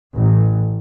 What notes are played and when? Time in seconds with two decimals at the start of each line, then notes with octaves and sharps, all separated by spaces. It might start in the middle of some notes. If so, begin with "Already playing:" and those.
0.15 A1